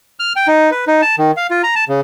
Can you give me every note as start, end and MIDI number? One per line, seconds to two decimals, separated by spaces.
0.20 0.33 89
0.36 0.47 79
0.48 0.70 63
0.71 0.85 71
0.87 1.01 63
1.02 1.15 81
1.18 1.31 51
1.37 1.47 77
1.51 1.62 65
1.63 1.75 82
1.76 1.84 81
1.89 2.01 49